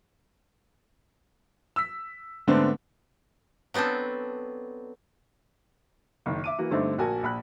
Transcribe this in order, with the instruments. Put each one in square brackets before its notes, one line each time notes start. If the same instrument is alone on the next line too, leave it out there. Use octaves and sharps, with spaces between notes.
[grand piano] E6 B6
G#2 D3 A3 B3 C4 D4
[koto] F#3 B3 C4 D4 A4
[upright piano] F#1 D#3
E5 D6 D#7
E3 A#3 F#4
G2 D3 A3 C4 D4 D#4
A#1 F#4 A#4 G#5 A5
A#1 B5 F#6